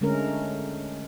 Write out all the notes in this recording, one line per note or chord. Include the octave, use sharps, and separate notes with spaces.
D3 G#3 A3 C#4 A#4